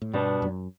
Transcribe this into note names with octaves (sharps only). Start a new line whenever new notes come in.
A2
G2 B2 G3 B3 D4
F#2